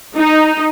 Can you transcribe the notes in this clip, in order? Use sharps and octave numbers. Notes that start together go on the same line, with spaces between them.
D#4